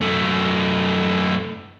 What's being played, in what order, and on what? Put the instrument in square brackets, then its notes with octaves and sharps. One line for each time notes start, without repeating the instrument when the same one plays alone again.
[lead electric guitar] F#2 A3